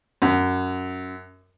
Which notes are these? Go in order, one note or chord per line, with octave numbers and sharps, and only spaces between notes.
F#2